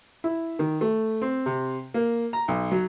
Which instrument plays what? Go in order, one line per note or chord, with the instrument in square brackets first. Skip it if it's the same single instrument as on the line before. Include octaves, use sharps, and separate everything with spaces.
[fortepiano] E4
D#3
A3
C4
C3
A#3
A#5
B1
F#3